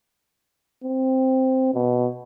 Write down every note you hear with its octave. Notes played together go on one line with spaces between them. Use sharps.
C4
B2